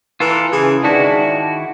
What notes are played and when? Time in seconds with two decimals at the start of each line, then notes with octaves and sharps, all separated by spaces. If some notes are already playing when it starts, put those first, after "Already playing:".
0.20 E3 F4 A4 A#4
0.52 C#3 E3 G#4
0.84 G#2 D#3 D4 E4 F#4